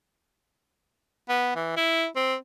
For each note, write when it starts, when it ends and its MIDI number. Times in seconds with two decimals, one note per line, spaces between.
1.29 1.51 59
1.56 1.74 52
1.77 2.07 64
2.16 2.36 60